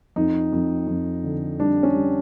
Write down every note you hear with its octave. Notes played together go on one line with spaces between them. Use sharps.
F2 D#4
F2
F2
D3
G3 D4
C#4
G3